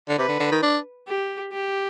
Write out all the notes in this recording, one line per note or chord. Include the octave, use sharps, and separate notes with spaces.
D3
C3 B4
D3
D3
D#3
D4
G4
G4